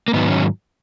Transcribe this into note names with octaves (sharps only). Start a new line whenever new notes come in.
A#3
G#2 D#3 F#3 B3
C#4